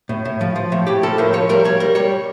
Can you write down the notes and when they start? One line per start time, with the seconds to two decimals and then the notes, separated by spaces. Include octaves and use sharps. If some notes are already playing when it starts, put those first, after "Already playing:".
0.09 A2
0.25 A2
0.41 F3
0.56 F3
0.72 A2
0.87 A2 G4
1.03 F3 A4
1.18 A2 A#4
1.33 F3 C#5
1.49 G3 A#4
1.65 G3 C#5
1.80 G3 A#4
1.95 G3 C#5